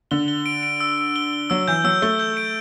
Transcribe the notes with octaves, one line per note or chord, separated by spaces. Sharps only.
D3 G7
G7
D7
D7
E6
D7
G7
G7
F#3 E6
E3 G6
F#3 E6
A3 G7
G6
D7